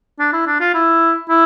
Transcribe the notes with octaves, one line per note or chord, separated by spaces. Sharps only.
D4
E4
D4
F4
E4
E4